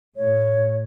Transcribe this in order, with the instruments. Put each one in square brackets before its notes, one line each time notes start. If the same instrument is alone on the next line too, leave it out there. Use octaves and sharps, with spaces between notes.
[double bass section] A2 [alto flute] C#5